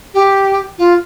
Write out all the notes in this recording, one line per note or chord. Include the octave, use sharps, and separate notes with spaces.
G4
F4